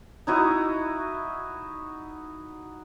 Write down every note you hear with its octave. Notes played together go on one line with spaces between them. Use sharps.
D#4 E4 F#4 D#5